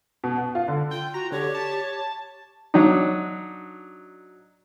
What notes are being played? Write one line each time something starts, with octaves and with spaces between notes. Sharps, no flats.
B2
F#5
F4
D3
F4 G5
F#4 A#5
D3 G4 C#5
A5
F#3 D4 D#4